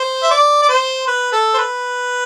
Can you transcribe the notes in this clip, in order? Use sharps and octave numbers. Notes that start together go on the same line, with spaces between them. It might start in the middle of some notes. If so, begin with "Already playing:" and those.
Already playing: C5
E5
D5
D5
C5
B4
A4
C5
B4